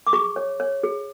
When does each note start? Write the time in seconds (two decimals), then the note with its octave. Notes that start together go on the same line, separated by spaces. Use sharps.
0.07 D6
0.13 G#4 C#6
0.36 C#5
0.60 C#5
0.83 G#4